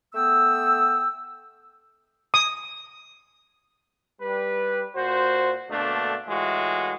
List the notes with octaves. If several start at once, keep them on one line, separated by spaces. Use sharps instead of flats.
A3 B3 G5 E6
D#6
G3 B4
A#2 F#4 C5
B2 D3 A3 A#3 D4
A2 E3 G#3 F4 F#4